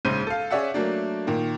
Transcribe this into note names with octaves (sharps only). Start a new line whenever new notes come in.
A#1 G#2 C#3 C5 G6 D#7
A4 F5
C#4 G#4 C#5 D5 E5 F#5
F#3 A3 A#3 D4
A#2 D#3 A#3